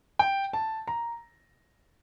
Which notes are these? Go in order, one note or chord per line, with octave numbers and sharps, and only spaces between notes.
G5
A5
A#5